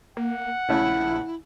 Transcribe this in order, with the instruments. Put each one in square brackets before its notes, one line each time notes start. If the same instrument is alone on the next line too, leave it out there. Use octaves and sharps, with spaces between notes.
[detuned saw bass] A#3 [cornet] F#5
[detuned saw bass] A#1 [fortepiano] C#3 A3 C#4 [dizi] E4